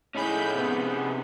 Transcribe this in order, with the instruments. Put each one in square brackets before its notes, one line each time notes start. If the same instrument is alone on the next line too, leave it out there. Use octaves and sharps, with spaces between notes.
[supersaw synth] A2 B5 G6 [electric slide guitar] C#4 D#4 G#4
[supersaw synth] C3 B3